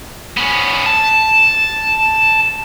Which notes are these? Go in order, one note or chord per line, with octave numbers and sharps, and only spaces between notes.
B3 C#4
A5